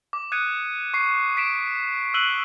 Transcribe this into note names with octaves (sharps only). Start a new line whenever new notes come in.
D6
D#6 F#6 G#6 C#7 D#7
C#6 C7
B6 D7 E7
E6 F#6 D#7 F#7 G7